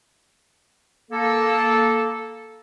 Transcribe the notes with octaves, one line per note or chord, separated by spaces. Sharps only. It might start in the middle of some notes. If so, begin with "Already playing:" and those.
A#3 A4